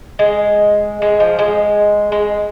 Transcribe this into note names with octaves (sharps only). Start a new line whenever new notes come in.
G#3
G#3
F3
G#3
G#3